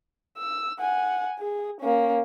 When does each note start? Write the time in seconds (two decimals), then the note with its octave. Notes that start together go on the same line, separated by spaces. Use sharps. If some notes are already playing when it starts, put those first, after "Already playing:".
0.38 E6
0.80 F#5 G#5
1.39 G#4
1.81 A#3 C#4